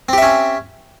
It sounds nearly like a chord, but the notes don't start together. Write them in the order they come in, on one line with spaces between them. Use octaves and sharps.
C4 G4 E5 C#4